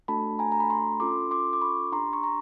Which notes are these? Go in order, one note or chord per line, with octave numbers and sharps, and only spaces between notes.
A3 D4 F#4 A4 A5 B5
G#5 A#5
A#5
B5
A#5 C6
C#4 F4 A4 C6 D6
C6 D6
D6
B5 C#6
D4 G4 A#5 C6
C#6
A#5 C6